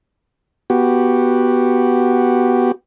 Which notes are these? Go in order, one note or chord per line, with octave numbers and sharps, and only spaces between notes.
B3 F#4 G4